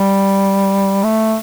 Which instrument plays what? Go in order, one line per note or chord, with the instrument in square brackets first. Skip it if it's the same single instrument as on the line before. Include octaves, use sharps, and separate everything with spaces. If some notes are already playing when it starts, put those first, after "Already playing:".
Already playing: [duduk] G3
A3